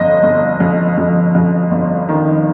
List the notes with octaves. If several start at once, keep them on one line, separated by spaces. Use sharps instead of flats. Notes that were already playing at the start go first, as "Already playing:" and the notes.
Already playing: G1 F2 D#5
G1
F2
F2
F2
G1
D#3